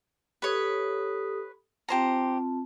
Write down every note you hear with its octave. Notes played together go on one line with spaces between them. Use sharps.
G4 A4 B4 C#5 D#6
C4 F4 G4 C5 A5 A#5